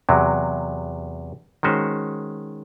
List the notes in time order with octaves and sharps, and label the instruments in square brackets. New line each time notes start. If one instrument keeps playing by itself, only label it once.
[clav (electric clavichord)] E2 C3 F#3
D#3 G#3 C#4 F#4 C5